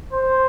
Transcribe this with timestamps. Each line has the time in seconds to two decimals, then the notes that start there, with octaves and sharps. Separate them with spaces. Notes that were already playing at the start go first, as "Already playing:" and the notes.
0.13 C5